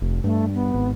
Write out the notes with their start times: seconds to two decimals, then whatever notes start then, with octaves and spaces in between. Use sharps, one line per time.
0.02 F1
0.24 G2 A3
0.54 B3
0.74 G#1